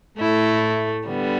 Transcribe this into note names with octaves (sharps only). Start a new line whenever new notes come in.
A2 A3 E4
D3 G3 B3